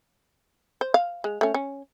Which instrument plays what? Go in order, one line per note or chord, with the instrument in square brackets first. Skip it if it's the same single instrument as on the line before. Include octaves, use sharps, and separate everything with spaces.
[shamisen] C5
F5
G#3
A3 C#4
C#4